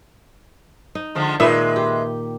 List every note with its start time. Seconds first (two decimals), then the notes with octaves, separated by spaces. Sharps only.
0.95 D#4
1.15 D3 F3 G#3
1.40 A#2 D#3 G#3 D#4 B4 E5
1.76 G4